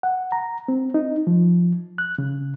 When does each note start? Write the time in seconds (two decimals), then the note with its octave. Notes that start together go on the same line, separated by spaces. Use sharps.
0.03 F#5
0.32 A#5
0.68 C4
0.94 D#4
1.27 F3
1.98 F#6
2.18 C#3